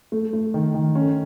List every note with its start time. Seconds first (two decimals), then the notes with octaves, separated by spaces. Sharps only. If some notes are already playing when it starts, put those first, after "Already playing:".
0.12 A3
0.33 A3
0.54 D#3
0.74 D#3
0.95 C#4